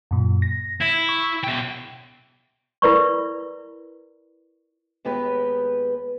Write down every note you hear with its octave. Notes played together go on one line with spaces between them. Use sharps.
F#2 A#2
A#6
E4
C#6
B2 G5
E4 A#4 B4 D5 B5 C#6
D#2 G#3 B3 G4 B4